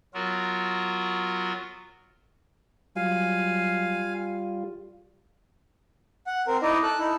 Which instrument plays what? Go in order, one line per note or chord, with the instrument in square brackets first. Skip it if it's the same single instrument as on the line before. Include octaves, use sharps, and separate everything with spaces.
[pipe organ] F#3 B3 F4 F#4 A#4
[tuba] F#3 [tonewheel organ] G3 F4 [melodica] F5 G#5
[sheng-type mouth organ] F#5
C4 A#4
D#4 E4 D5 D#5
A4 F#6
D#4 E4